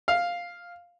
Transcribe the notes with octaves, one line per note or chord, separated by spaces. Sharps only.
F5